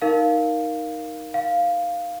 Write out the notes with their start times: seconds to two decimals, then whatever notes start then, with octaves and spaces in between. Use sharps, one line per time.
0.02 D#4 A#4 F5
1.34 F5